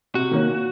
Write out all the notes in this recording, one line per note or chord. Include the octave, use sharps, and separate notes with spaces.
C3 F#4
D#3 A#3 C#4
A#2